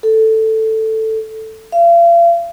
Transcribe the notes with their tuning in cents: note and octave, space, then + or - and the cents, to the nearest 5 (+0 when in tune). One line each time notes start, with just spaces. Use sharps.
A4 +5
F5 -40